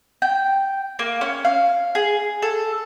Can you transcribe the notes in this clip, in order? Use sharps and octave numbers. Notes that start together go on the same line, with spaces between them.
G5
A#3
C#4
F5
G#4
A4